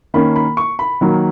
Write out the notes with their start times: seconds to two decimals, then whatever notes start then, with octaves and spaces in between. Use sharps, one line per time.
0.14 D#3 A#3 C#4 B5
0.36 B5
0.57 C#6
0.79 B5
1.01 D#3 F#3 A#3